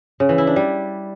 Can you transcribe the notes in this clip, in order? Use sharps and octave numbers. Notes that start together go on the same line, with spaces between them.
C#3
E3
E4
D4
G3